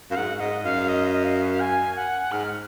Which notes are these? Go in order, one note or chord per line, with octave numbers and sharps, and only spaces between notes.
F#2 F5
G#2 F#5
G#2 D#5
F#2 F5
D#5
D#5
F5
G#5
F#5
G#2 F6